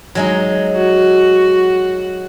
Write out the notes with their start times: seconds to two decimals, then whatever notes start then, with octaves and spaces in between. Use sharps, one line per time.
0.15 F#3 G#3 D#4
0.75 F#4